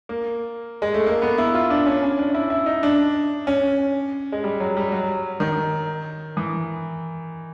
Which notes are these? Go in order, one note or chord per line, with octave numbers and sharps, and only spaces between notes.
A#3
G#3
A3
A#3
B3
E4
F4
D4
C#4
C#4
D4
E4
E4
D#4
D4
C#4
G#3
G3
F#3
G3
F#3
D#3
E3